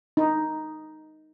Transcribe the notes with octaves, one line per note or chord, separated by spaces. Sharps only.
D#4